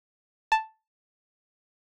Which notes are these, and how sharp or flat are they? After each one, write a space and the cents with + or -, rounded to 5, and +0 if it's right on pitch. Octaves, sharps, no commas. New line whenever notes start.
A5 +0